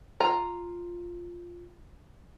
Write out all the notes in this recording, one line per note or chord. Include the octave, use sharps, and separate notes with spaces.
F4 A#5